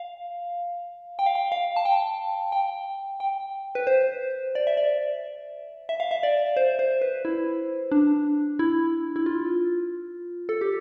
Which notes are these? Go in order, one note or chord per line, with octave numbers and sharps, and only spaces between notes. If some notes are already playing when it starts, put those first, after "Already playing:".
Already playing: F5
G5
F5
G5
F5
A5
G5
G5
G5
B4
C5
D5
E5
D5
E5
F5
E5
D5
C5
C5
B4
E4
D4
E4
E4
F4
A4
G4